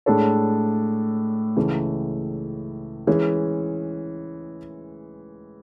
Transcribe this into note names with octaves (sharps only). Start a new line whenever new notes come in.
A2 G#3 D4 A4 C#5
C#2 C#3 E3 A3
E3 G#3 C#4 G#4